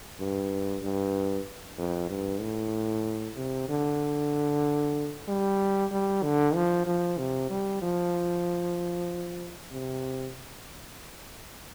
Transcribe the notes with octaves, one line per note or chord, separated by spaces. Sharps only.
G2
G2
F2
G2
A2
C3
D3
G3
G3
D3
F3
F3
C3
G3
F3
C3